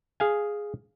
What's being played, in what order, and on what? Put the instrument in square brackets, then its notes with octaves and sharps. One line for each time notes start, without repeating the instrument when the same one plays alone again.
[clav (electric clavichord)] G#4 F5 G#5